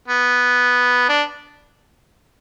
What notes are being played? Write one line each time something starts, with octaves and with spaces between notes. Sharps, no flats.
B3
D4